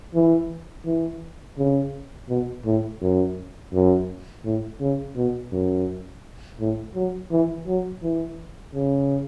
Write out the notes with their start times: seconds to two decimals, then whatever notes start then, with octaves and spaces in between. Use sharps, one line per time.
0.14 E3
0.85 E3
1.58 C#3
2.29 B2
2.65 A2
3.01 F#2
3.73 F#2
4.44 A2
4.80 C#3
5.16 B2
5.52 F#2
6.60 A2
6.95 F#3
7.31 E3
7.67 F#3
8.03 E3
8.74 C#3